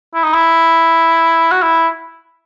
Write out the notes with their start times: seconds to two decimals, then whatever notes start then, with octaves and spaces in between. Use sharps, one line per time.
0.14 E4
0.23 D#4
0.33 E4
1.52 F#4
1.63 E4